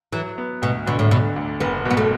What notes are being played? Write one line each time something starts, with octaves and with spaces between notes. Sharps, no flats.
E3 F#3
B3
D2 B2
B2 D3
A2
B2 D3
D2
F#1 B3
B2
B3
A3